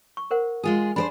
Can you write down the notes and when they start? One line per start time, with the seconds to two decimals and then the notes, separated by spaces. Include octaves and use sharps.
0.17 C#6
0.31 A#4 C5 F#5
0.63 G#3 F4 G#4
0.96 D4 A#4 C5 G#5 B5